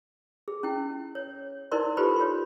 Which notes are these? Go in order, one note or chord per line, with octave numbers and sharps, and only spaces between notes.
G#4
C#4 E4 G5
C#5
D#4 E4 A#4 C5 D5 C6
F4 G4 A4 B4 C5 B5
C#5 C6